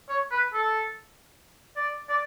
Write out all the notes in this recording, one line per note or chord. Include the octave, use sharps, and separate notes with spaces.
C#5
B4
A4
D5
D5